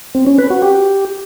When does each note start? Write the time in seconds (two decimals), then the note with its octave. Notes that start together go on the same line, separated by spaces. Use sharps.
0.15 C4
0.27 C#4
0.38 B4
0.50 F#4
0.62 G4